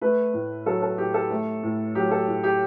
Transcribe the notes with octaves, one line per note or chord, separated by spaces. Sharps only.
A3 B4
A2
F#3 A4
A4
A2 G4
A4
A3
A2
F#3 G4
A4
A2
G4